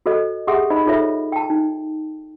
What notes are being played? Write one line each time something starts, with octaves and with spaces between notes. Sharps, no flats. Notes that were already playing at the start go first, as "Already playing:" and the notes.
F#4 A4 C5 D#5
G4 G#4 E5 F#5 C6 D#6
D#4 C5 D#5 B5
D#4 F4 A4 C5 C#5 E5
G5 A5
D#4